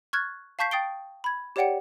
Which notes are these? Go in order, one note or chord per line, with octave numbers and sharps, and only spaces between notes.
C#6 F6 F#6 G#6 A6
F5 A5 C#6 G6 B6 C7
G5 D#6 A6 C7 D7 G7
B5 G#6
G4 C#5 D5 F#5 G5 C#7